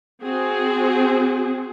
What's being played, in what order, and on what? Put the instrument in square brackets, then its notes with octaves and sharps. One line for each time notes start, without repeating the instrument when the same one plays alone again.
[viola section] C4 F#4 G#4